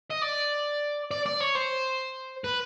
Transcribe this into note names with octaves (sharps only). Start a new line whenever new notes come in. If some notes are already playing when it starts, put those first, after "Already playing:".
D#5
D5
D5
D5
C#5
C5
B4